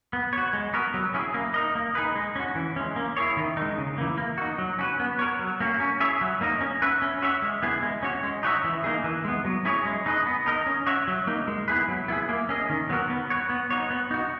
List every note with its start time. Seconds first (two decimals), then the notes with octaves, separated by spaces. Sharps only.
0.13 B3
0.33 F#4 C#5
0.53 G#3
0.73 B3 F#4 A#4
0.94 F#3
1.14 C#4 E4 G#4
1.34 A#3
1.54 D#4 A#4 D#5
1.75 A#3
1.95 D#4 G#4 B4
2.15 G#3
2.36 C#4 F#4
2.55 E3
2.76 G#3 C#4
2.96 A#3
3.17 E4 G#4 C#5
3.37 D#3
3.57 G#3 D#4
3.78 C#3
3.98 E3 A#3
4.17 A#3
4.38 D#4 F#4
4.58 F#3
4.79 C#4 F#4 B4
5.00 B3
5.19 F#4 A#4 C#5
5.39 F#3
5.60 A#3 C#4 F#4
5.80 C#4
6.00 E4 G#4 C#5 E5
6.21 F#3
6.41 A#3 D#4 A#4 D#5
6.61 C#4
6.82 F#4 B4 E5
7.02 C#4
7.22 F#4 C#5 E5
7.42 G#3
7.62 B3 E4 G#4
7.83 G#3
8.03 C#4 F#4 C#5
8.23 G#3
8.43 D#4 F#4 C#5 E5
8.64 E3
8.84 A#3 D#4 G#4
9.04 E3
9.25 G#3 B3
9.45 F#3
9.65 C#4 E4 G#4 C#5
9.85 G#3
10.06 D#4 G#4 B4 D#5
10.26 B3
10.46 D#4 A#4 D#5
10.66 C#4
10.87 F#4 C#5 E5
11.08 F#3
11.27 A#3 D#4
11.48 G#3
11.68 B3 E4 G#4 B4
11.88 F#3
12.08 B3 E4 G#4
12.29 A#3
12.49 C#4 G#4 D#5
12.69 D#3
12.89 F#3 B3 F#4 A#4
13.10 B3
13.30 F#4 C#5
13.50 B3
13.70 D#4 F#4 C#5
13.90 B3
14.11 D#4 F#4